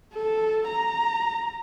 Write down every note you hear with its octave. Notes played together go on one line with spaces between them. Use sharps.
A4
A#5